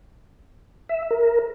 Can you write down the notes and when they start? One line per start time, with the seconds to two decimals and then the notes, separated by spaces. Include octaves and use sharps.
0.89 E5
1.11 A#4